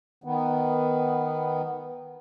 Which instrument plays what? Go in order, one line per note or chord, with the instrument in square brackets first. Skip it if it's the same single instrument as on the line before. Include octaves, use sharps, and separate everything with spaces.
[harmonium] D#3 B3